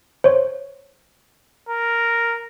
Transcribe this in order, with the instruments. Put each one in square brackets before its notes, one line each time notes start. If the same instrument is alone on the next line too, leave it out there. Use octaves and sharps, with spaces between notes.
[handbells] C5 C#5
[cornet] A#4